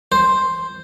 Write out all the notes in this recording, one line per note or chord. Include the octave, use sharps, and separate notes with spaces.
C5